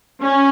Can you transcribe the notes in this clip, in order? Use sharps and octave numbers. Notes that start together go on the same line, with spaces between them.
C#4